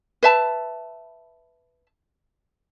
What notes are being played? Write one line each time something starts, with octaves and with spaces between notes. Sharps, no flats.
B4 E5 A5